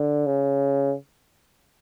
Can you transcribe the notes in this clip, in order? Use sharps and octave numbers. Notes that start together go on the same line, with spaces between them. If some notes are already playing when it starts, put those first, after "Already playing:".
Already playing: D3
C#3